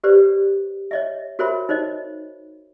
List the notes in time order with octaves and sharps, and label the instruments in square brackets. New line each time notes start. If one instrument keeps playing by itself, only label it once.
[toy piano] G4 B4 C5 D5
C#5 D#5 E5
F#4 A#4 C5 C#5 E5 B5
D#4 C5 C#5 D#5